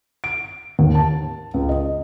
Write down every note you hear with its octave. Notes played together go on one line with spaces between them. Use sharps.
D7
D#2
A5
C#2
D#5